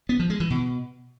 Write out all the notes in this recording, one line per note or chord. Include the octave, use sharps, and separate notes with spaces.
B3
F3
G#3
E3
B2